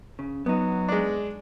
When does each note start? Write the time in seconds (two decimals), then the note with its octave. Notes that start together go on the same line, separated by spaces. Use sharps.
0.19 C#3
0.46 F#3 B3 D#4
0.88 G#3 D4